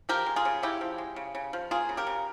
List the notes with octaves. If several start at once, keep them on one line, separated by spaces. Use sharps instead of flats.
F3 G4 A#4
G#3
F4 G#4
C#3
C#3 E4 G4
F3
G#3
C#3
C#3
F3
A#3 F4 G#4
C#3
G4 A#4
C#3